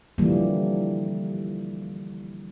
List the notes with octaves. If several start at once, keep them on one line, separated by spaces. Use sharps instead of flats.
D3 E3 F3 G3 A#3